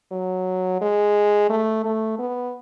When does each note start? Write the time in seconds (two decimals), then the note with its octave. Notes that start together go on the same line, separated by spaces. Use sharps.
0.12 F#3
0.81 G#3
1.50 A3
1.85 A3
2.19 B3